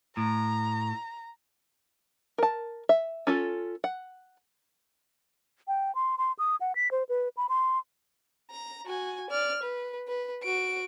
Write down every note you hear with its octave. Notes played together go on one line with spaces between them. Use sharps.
A2 A#5
A#4 A5
E5
C#4 F4 A4
F#5
G5
C6
C6
D#6
F#5
B6
C5
B4
B5
C6
A#5
F#4 G#5
D5 F6
B4
B4
F#4 D7